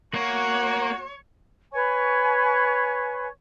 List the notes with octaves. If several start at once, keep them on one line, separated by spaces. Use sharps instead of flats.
A#3 F#4 C#5
B4 C#5 G#5 C#6